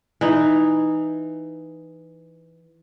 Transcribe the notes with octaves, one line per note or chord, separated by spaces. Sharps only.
E3 D#4